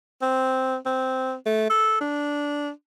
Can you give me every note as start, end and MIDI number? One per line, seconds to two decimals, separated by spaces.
0.22 0.77 60
0.86 1.34 60
1.46 1.66 57
1.70 2.01 69
2.01 2.70 62